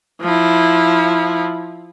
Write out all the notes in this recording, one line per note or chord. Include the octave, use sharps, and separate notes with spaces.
F3 E4